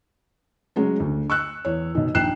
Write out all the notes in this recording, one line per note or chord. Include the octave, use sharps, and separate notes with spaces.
C#3 F#3 G#3 C#4
D2
C#6 E6 F#6
E2 C#5
B2 D#3
A#1 D#2 G5 F#6 C7 E7